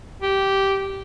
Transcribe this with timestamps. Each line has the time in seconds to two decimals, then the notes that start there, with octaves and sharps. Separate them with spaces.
0.22 G4